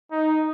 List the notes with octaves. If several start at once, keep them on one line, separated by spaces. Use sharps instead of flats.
D#4